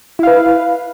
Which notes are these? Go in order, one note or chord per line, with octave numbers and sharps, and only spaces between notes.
E4 B4 F5